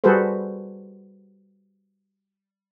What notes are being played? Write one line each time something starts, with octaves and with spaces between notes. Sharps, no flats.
G3 F#4 G#4 A4 B4 C5